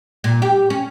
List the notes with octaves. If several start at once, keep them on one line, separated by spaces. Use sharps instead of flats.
A#2
G4
C#4